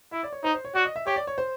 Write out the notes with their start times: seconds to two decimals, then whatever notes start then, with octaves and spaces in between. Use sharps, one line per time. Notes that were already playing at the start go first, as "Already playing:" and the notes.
0.12 E4 E5
0.23 D5
0.32 C#5
0.44 D#4 C5
0.54 C5
0.65 C#5
0.75 F#4 D5
0.85 D#5
0.96 E5
1.07 G4 C#5
1.16 D5
1.27 C#5
1.38 C5